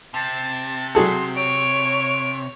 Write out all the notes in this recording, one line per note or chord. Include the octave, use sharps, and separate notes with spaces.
C3 A5
F#3 G#4 A4 C6
C#5 D7